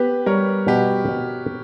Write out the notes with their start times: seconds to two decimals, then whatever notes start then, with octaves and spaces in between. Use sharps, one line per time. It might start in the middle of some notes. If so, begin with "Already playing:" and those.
Already playing: B3 G4 B4
0.26 G3 A#4 C#5
0.67 B2 G4 B4
1.09 B2